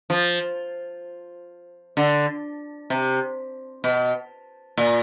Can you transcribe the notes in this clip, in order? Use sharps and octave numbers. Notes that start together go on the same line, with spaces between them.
F3
D3
C3
B2
A#2